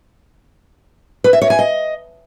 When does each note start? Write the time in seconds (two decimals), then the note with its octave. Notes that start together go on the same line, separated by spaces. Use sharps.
1.24 B4
1.33 E5
1.42 C#5
1.50 G#5
1.59 D#5